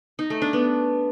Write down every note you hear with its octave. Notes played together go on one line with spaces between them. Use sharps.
D#4
A3
D4
B3